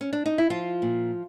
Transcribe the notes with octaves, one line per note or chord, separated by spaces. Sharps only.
C#4
D4
D#4
E4
F3 F4
A#2